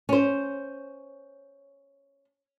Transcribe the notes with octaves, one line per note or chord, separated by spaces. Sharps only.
C#4 C5